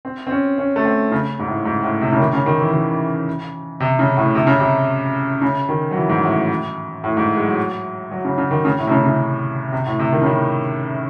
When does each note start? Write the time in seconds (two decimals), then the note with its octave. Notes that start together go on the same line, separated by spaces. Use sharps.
0.05 C4
0.27 C4
0.31 C#4
0.58 C#4
0.76 A3
0.85 C4
1.12 C#3
1.39 G#2
1.47 A2
1.65 G#2
1.83 A2
2.01 C3
2.12 C#3
2.19 D#3
2.33 C#3
2.46 D#3
2.60 E3
2.74 D#3
3.80 C3
3.99 C#3
4.17 A2
4.35 C3
4.47 C#3
4.60 C3
5.42 C#3
5.69 D#3
5.91 F#3
5.95 E3
6.09 G#2
6.23 A2
7.04 A2
7.17 G#2
7.37 G#3
7.44 F#3
8.11 F#3
8.25 C#3
8.38 C#3
8.51 D#3
8.65 C#3
8.79 A2
8.87 C3
8.91 C#3
9.05 C#3
9.72 C3
9.86 A2
9.99 C3
10.12 D#3
10.21 C#3
10.26 D#3